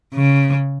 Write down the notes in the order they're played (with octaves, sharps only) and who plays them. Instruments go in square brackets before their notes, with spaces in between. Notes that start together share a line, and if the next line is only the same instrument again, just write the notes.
[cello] C#3